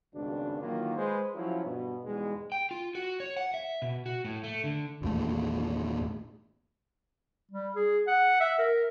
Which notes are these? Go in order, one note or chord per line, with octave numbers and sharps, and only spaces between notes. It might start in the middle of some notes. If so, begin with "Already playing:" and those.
G#1 C#2 G2 B2 D4
D#3 E3 F#3 A#3 F4
G#3 B4 C5
F3 F#3 C#4 E4 F4
G2 B2
E2 G#2 B2 G3 G#3
G5
F4
F#4
C#5
F#5
E5
B2
F#4
A2
A3
D3
G#1 E2 A#2 A3
G3
G#4
F#5
E5
A#4